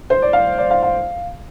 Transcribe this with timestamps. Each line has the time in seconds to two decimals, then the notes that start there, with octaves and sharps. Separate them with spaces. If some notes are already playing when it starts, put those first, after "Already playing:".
0.10 C5
0.22 D5
0.33 F5
0.58 D5
0.71 F5
0.83 F5